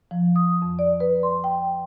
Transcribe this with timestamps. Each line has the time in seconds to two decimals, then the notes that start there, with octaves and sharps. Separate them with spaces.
0.11 F3
0.36 D#6
0.62 F2
0.79 D5
1.00 B4
1.23 C6
1.44 G5